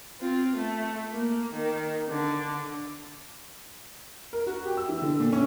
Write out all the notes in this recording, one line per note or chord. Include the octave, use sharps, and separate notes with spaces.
C4 F4
A3
A#3
D#3
D3
A#4
F#4
G4
E6
E3
D3
A#2
C#4